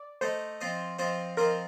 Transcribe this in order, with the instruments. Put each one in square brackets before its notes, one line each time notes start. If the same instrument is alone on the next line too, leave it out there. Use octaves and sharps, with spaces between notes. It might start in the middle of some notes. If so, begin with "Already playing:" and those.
Already playing: [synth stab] D5
[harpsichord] A3 D#4 A4 [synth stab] C5
[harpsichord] F3 C4 F4 C5 D#5
F3 C4 F4 C5 D#5
[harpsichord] F3 C4 F4 C5 D#5 [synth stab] A#4